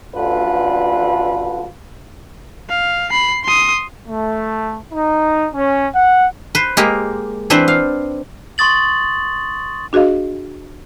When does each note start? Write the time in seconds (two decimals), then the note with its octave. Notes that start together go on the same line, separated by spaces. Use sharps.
0.14 A1 D2 D3 F4 B4
2.69 F5
3.10 B5 C7
3.44 C6 D#6
4.07 A3
4.93 D#4
5.54 C#4
5.94 F#5
6.55 B4 C5
6.77 G#3 A#3 G4 A#4
7.50 E3 C4 D4 B4 C5
7.68 F5
8.58 C6 C#6 D#6 A6 F#7
9.93 D4 F#4 G#4 D#5 F5